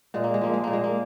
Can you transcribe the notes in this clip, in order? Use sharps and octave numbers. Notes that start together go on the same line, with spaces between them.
A#2 G#3
A#3
G#3
F3 A#3
G#3
A#2 A#3
G#3
A#3